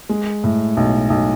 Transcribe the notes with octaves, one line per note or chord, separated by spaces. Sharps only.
G#3
A2
B1
B1